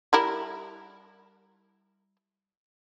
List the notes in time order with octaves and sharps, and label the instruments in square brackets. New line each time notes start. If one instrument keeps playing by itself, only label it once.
[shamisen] G3 E4 A#4